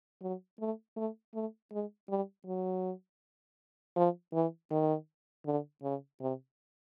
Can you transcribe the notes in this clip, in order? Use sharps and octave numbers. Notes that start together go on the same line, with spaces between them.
F#3
A3
A3
A3
G#3
G3
F#3
F3
E3
D#3
D3
C#3
C3